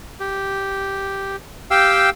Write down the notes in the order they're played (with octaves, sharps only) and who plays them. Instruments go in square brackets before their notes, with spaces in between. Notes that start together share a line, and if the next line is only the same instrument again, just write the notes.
[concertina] G4
G4 F5 G5 E6